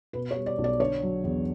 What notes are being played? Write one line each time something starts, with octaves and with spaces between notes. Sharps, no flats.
B2 B4
C#5
G3
D5
B1
D5
D3 C#5
F#3
E2